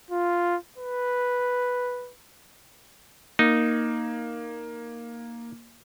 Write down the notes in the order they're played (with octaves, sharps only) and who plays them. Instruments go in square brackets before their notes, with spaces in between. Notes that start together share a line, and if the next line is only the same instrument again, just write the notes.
[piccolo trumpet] F4
B4
[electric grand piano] A#3 [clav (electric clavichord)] D#4